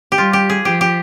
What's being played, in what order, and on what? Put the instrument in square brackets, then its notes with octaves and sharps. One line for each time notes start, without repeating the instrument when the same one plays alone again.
[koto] G4
[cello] G3 [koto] F4
[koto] G4
G#4
[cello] F3 [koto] G4
[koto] G4